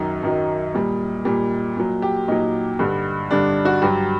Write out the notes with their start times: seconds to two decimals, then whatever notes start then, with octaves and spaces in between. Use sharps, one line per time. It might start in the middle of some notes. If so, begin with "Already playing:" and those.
Already playing: F#2 D#3 F#3 D#4
0.23 F#2 D#3 F#3
0.74 A#2 G3
1.25 A#2 G3
1.77 A#2 F#3
2.02 G4
2.28 A#2 F#3 D#4
2.79 G2 D3 G3
3.31 G2 D3 G3 D4
3.65 F#4
3.82 G2 F#3 G4